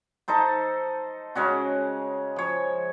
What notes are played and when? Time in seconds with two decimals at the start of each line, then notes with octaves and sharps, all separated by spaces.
0.28 D#4 A4 C5
1.35 C#3 G#3 C#4 F#4
2.36 F3 C#5